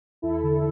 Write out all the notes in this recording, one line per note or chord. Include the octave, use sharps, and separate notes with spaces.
E2 E4 A4
D3 E4